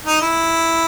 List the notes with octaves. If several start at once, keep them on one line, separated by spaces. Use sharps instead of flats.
D#4
E4